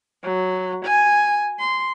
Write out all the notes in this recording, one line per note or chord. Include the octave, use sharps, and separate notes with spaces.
F#3
G#5
C6